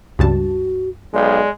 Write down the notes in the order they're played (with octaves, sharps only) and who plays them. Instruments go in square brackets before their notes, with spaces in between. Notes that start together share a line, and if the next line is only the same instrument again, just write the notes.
[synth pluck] C#2 G2 A5 [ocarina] F#4
[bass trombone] B1 [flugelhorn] G#3 [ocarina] D5